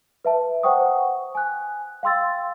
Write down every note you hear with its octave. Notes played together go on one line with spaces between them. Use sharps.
B4 E5 A5
C5 F#5 G5 C#6 D#6
G#5 F#6
F5 G5 C6 E6 A6